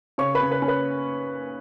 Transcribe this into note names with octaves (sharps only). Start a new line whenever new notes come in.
C#3 C#5 C#6
B4 B5
C#3
B4
C#4
B4